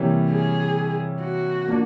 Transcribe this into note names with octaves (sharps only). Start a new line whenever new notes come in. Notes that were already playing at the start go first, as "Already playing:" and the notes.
Already playing: C3 E3 G3 A#3 C#4
G#4
F#4
F3 A#3 D4